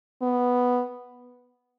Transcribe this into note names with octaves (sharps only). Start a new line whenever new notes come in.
B3